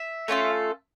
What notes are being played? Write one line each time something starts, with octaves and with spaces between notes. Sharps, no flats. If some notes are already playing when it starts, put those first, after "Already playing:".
Already playing: E5
A3 C#4 F4 A4